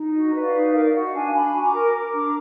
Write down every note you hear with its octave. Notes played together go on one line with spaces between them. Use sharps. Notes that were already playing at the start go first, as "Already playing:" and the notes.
Already playing: D#4
F#4 D#5
B4
D5 F5
D#4
A#4 D5 F5
F#4 D#5 F#5
D4 F5 G#5
D4 G#5 B5
F#4
A#5 D6
A#4
A#4 A#5 D6
D4